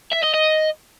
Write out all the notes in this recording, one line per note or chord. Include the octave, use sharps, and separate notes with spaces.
E5
D#5
D#5